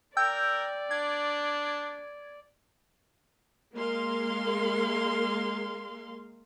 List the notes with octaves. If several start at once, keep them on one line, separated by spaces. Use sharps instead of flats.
A#4 D5 G5 E6 G6
D4 G#6
G#3 A#3 A#4 F5 C6